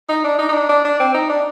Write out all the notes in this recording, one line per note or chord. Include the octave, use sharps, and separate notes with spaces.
D#4
D4
D#4
D#4
D4
D4
D4
C4
D#4
D4